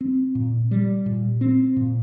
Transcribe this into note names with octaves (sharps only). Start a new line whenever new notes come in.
C4
A#2
G3
A#2
C4
A#2